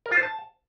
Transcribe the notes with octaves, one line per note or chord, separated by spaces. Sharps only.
A#4
F4
C5
A5